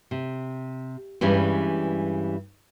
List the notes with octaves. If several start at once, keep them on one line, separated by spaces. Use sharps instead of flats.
C3
G2 E3 G3 G#3 C#4